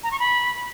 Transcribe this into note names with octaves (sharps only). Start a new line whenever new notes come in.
A#5
C#6
B5